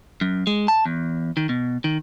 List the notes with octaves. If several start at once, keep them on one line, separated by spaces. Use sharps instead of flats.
F#2
G#3
A5
E2
D#3
B2
D#3